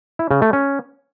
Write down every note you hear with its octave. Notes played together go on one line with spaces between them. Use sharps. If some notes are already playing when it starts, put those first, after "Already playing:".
E4
C#3
A3
C#4